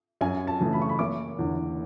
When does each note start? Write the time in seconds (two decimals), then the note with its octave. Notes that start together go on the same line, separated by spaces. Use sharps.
0.21 F#2 G#5
0.47 A5
0.60 C#3 E3 A3
0.73 B5
0.82 C#6
0.89 B5
0.99 F#1 D6
1.39 E2 D3